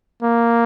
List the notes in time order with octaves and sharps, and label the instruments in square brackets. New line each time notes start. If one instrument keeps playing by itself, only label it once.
[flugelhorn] A#3